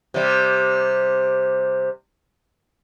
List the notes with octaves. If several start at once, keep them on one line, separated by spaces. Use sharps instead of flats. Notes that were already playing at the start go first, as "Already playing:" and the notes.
C3 G3